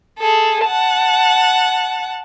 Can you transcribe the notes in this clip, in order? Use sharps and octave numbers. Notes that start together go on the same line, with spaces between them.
G#4 A4
F#5 A5